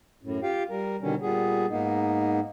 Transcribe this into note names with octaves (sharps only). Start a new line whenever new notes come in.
F#2 A2
F4 G4 F5 G5
G3 A#4
B2 D3 D#3 G3 C#4
A#2 G3 B3 G#4
G#2 A#3 B3 D#4